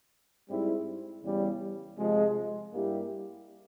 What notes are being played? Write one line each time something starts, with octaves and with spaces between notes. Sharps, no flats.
G#2 G3 C4 E4
E2 C#3 G3
C3 F3 G#3
G2 G3 A#3 E4 G4